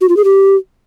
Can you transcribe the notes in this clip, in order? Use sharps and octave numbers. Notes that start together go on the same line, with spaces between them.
F#4
F4
G#4
G4